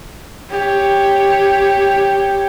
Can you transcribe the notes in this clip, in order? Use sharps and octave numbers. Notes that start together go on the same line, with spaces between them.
G4 C#5